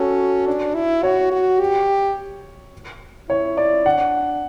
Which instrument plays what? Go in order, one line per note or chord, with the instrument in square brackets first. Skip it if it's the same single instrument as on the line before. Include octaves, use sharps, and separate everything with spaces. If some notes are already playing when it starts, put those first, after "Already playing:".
Already playing: [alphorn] C#4 [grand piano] F#4 A4
[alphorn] D4
E4
[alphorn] F#4 [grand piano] C#5
[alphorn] F#4
G4
[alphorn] E4 [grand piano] C#5
[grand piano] D5
[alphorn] D4 [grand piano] F#5